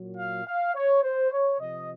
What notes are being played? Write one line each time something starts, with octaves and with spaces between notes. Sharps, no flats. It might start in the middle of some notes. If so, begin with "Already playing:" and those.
Already playing: A#2 F#3
F5
F5
C#5
C5
C#5
C3 F3 D#5